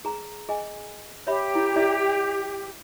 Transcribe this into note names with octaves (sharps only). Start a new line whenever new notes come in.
G#4 A#5
G#4 D#5 G#5
G4 C#5 E5 B5
E4
E4 D5 E5